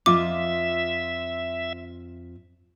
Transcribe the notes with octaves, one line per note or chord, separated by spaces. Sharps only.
F2 F4 D#5 E5 D6